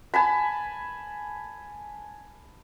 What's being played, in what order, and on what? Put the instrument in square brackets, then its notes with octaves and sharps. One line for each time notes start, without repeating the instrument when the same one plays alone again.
[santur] G#5 A5 B5